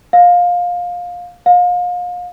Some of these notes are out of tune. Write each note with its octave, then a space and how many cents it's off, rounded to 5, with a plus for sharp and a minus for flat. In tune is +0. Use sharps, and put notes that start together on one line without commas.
F5 +20
F5 +35